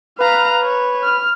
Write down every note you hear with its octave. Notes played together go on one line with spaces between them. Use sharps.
B4 F5 A#5
C#5
F6